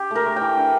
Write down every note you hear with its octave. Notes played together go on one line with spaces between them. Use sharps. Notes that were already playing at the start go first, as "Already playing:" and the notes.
Already playing: G4
A3 A#4
A3
E3 G5
D4